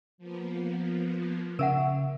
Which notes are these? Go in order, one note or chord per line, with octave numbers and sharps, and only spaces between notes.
F3 A#3 B3
C#3 A#4 E5 F#5